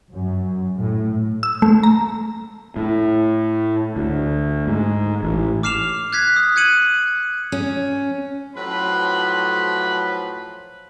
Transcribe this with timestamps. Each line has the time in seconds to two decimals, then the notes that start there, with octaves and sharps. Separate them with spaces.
0.12 F#2
0.78 A2
1.43 E6
1.62 A3
1.83 A#5
2.76 A2
3.96 D2
4.67 G#2
5.23 A1
5.63 D6 F6 C7 E7 F7
6.13 F#6 G#6 B6
6.36 D#6
6.56 F#6 G#6 C#7 D#7 F#7
7.52 C#4
8.56 A2 F3 F#3 B4 B5 C6